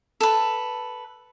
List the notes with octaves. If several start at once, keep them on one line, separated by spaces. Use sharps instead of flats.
A4 B4